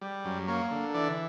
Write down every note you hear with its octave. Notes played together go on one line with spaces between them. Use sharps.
G3
F#2
A#3 C#5
D3
E3 D5